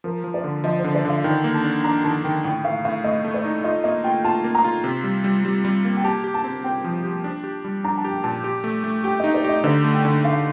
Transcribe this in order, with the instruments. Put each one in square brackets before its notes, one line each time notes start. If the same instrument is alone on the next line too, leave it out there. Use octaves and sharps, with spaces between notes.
[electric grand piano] F3 [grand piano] A#4
[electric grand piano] F3
[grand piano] D5
[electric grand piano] D3
[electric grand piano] F3 [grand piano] D#5
[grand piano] C5
[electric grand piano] D3
[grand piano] D5
[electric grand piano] D3 [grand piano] F5
[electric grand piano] D#3 [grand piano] G5
[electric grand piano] A#3
[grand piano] A5
[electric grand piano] D4
[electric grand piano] D4 [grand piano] A#5
[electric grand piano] D#3 [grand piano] A5
[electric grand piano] D#3 [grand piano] G5
[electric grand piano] A2 [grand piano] G5
[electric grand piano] A2 [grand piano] F5
[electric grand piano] A2 [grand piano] F5
[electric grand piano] A3 [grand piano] D#5
[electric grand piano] A3
[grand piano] D5
[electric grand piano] D#4
[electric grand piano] F4 [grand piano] D#5
[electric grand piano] A#3 [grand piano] D#5
[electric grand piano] F4 [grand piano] G5
[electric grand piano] F4 [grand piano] A5
[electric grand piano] A#3
[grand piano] A#5
[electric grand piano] F4
C3
G3
G3
G3
G3
A#3
[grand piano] G5
[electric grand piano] G4 [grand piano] A5
[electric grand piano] G4
[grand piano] A5
[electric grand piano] C4
[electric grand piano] C4 [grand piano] G5
[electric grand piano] F3
G4
D4
G4
G3
[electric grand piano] D4 [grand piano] A#5
[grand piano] A5
[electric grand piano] G4
[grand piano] G5
[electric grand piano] A#2 [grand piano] A5
[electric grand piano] G4
A3
A3
[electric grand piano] G4 [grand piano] G5
[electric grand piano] D#4 [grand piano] D#5
[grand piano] D5
[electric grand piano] G4 [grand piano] D#5
[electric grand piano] D3 [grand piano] D5
[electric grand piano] A3
[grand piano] G5
[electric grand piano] D3
[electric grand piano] D3 [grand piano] F5